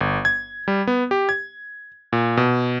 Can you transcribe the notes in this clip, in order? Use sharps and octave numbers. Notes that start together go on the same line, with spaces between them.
G1
G#6
G3
B3
G4
G#6
A#2
B2